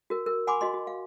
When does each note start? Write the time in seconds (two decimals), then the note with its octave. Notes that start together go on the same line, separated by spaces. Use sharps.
0.10 F#4 A#4
0.26 A#4
0.47 F#5 G#5 B5 C6 D6
0.61 F#4 D#5 C6
0.74 F#4
0.87 F5